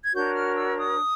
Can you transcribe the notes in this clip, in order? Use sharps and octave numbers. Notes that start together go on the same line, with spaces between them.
G#6
D4 F#4 A#4 C#5 G6
F6
E6
D#6